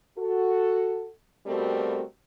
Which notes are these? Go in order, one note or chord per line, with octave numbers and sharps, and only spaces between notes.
F#4 A4
B2 G3 A3 C4 F#4 A#4